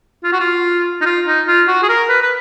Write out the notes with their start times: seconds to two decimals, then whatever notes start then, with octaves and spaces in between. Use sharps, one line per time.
0.24 F4
0.32 F#4
0.40 F4
1.01 D#4
1.06 F4
1.27 D#4
1.48 F4
1.68 F#4
1.83 G#4
1.89 A#4
2.09 B4
2.22 B4